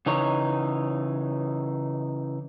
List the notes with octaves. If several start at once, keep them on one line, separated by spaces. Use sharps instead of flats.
C#3 E3 D#4 C#5